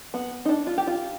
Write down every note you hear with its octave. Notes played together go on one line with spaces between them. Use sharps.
B3
D#4
D4
F4
G4
F4